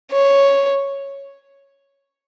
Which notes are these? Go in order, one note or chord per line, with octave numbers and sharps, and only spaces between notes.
C#5